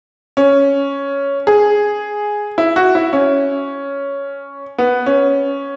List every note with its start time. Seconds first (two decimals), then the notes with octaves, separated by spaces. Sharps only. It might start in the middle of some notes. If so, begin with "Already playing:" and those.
0.37 C#4
1.47 G#4
2.58 E4
2.76 F#4
2.95 E4
3.13 C#4
4.78 B3
5.06 C#4